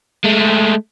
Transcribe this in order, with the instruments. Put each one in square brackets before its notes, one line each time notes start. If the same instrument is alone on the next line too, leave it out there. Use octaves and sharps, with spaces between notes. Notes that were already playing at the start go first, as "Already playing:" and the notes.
[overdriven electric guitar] G#3 A3